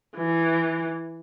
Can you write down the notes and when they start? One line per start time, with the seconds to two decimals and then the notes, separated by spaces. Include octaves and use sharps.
0.16 E3